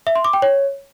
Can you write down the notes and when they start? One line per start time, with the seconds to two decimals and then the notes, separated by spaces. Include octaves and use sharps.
0.07 E5
0.16 C6
0.24 D6
0.33 G5
0.42 C#5